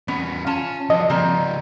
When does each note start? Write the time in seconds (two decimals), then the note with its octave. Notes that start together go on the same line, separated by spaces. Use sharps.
0.08 E2 B3 C#4
0.47 C#4 F4 A5
0.90 D3 F3 F#4 D#5
1.09 C#3 F3 G3 A#3 C4